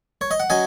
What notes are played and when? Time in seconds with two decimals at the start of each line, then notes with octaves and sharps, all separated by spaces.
0.21 C#5
0.31 D#5
0.40 F#5
0.50 F#3 C#4 D#5 G#5